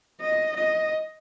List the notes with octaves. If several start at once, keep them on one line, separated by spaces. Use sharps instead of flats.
D#5
D#5